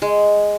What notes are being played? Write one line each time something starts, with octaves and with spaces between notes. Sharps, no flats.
G#3